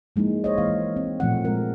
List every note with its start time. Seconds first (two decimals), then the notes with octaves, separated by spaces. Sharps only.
0.16 F3 G#3 A#3 D#4 E4
0.44 C5 C#5 D#5
0.58 E3 A#3 E4 F5
0.96 C4
1.20 A#2 F3 A3 C4 F#5
1.45 G#3 C4 A#4